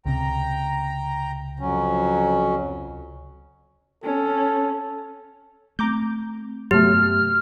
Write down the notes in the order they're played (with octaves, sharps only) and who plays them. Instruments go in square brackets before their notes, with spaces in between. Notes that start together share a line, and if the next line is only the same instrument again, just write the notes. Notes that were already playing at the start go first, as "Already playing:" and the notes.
[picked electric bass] C#2 C3 [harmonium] G5 A#5
[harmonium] F2 F#3 C#4
[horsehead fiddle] C#4 [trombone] A4
[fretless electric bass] A3 C4 [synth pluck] A#5 D6 G6
[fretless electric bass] G2 C3 B3 [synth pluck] F#3 A3 [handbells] G4 [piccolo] F6